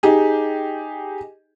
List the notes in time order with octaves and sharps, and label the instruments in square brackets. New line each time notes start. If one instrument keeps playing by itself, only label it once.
[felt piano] D#4 G4 G#4